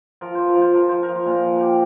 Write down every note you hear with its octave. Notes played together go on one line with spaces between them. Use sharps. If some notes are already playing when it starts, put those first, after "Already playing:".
F3 A#4
F3 C5
A#4
F3
C5
F3 A#4
F3 C5
A#4
F3
C5
A#2 A#4
F3
G4 A#4